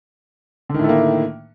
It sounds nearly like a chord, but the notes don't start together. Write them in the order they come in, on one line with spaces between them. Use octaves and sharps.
D3 D#3 A2 A3 A#3